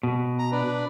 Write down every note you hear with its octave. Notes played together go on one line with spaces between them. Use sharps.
B2
A#5
D4 B4